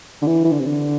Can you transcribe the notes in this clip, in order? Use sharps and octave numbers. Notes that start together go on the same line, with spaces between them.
D3
E3
E3
D3
C3
D3